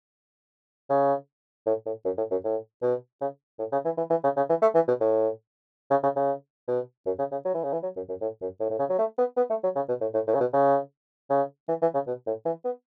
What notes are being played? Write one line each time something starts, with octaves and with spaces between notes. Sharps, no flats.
C#3
A2
A2
F#2
A2
F#2
A2
B2
C#3
A2
C#3
E3
E3
E3
C#3
C#3
E3
A3
E3
B2
A2
C#3
C#3
C#3
B2
F#2
C#3
C#3
F#3
E3
C#3
E3
F#3
F#2
F#2
A2
F#2
A2
A2
C#3
F#3
A3
B3
B3
A3
F#3
C#3
B2
A2
A2
A2
C#3
B2
C#3
C#3
E3
E3
C#3
B2
A2
E3
B3